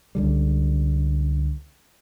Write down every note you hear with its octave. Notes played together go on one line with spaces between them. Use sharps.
C#2 D3 G3